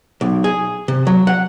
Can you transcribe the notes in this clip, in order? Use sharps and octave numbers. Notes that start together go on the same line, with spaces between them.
B1
G#4
C3
F#3
F#5